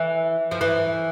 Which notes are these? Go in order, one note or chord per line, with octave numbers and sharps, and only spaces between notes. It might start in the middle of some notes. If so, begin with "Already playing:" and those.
Already playing: E3
F3
E3